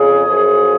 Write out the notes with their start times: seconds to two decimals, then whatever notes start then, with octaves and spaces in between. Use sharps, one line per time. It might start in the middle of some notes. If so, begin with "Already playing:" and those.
Already playing: F2 C#3 G#4
0.26 F#2 F3